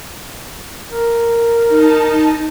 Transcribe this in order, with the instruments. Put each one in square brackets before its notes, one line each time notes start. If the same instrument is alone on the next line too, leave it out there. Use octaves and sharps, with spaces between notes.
[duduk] A#4
[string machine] D#4 A5